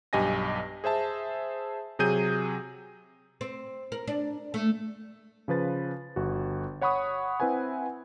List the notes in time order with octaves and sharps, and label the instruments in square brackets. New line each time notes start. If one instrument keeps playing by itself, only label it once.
[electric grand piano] B1 G2 G4 D#5 G#5 A#6
G#4 C5 E5 A5
C3 F#3 G#4 G6 D#7
[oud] C4
A#4
D4
A3
[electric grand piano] C#3 F3 B4 A6
G1 F#4
C#5 F#5 B5 C#6 D#6
C4 E4 B4 F#5 G#5